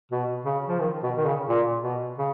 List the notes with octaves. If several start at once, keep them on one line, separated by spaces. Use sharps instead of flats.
B2
C#3
F3
D#3
B2
D#3
C#3
A#2
B2
C#3